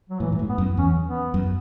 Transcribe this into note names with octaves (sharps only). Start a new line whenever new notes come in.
F#3
A2 E3
G#2
A2
B3
F#2
E2 C#4
B3
F#2